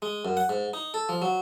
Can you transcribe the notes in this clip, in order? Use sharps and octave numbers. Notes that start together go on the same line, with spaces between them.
G#3
F#2
F#5
G#2
D#4
A4
F3
F#3